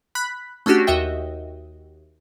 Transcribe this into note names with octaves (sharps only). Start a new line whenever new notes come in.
B5 F#6 B6
A3 C#4 D4 F#4 G4
D#2 F#4 D#5 E5 G5